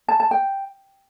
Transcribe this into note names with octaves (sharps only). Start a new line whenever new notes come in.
A5
A5
G5